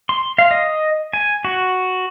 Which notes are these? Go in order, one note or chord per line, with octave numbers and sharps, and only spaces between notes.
C6
F5
D#5
G#5
F#4